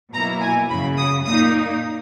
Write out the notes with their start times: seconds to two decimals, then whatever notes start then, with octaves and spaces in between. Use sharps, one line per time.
0.13 B2 F#3 A#3 E4 A#5
0.42 G#5
0.70 F#2 C#3 F#3 B5
0.98 D#6
1.26 A#2 A#3 D#4 D#6